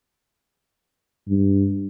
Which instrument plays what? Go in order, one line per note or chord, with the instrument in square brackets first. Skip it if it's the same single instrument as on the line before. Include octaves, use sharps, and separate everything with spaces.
[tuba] G2